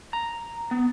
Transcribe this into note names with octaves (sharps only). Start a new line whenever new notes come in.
A#5
B3